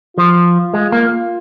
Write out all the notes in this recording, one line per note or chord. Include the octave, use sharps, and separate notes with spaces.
F3 F4
G#3
A#3